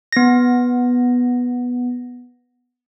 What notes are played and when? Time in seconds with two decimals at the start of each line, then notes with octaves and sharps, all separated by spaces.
0.13 B3 A#6